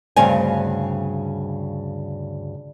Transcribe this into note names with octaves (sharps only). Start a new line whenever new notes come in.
D2 G2 C#3 C4 G#5